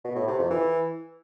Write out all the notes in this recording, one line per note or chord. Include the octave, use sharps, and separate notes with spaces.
B2
A2
C3
F2
E3